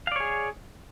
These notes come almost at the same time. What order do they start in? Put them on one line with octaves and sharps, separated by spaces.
F5 D5 C#5 G#4